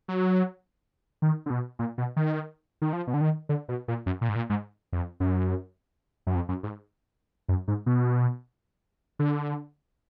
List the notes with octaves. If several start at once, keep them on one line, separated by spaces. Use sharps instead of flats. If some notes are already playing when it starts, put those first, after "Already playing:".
F#3
D#3
D3
B2
A#2
B2
D#3
D#3
F3
B2
D3
D#3
D3
B2
A#2
F#2
A#2
G#2
A#2
G#2
F2
F#2
F#2
F2
F#2
G#2
F#2
G#2
B2
D3